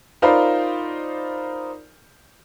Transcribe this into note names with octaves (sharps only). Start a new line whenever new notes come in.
D#4 F4 A#4 C5 D5 B5